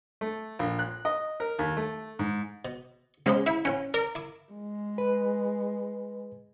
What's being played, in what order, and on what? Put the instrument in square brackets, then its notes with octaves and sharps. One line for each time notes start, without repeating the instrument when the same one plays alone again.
[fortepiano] A3
A#1
F#6
D#5
A#4
D#2
A3
G#2
[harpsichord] B2
[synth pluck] C#3 G#3 [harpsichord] B3 C4 G4
[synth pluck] E4 [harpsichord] E5 F5
[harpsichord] A1 F#5 [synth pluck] C#4
[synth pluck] A#4 [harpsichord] D5
[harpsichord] E4 D6
[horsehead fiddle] G#3
[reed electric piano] B4